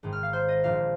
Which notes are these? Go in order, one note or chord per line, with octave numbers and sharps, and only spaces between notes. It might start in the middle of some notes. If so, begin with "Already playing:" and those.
G#1 G#2 D#3 G#3
F6
F5
C5
D#5
A#1 A#2 F3 G#3 F5